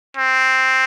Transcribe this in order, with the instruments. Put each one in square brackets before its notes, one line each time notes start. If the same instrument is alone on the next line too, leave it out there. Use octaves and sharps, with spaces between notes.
[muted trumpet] C4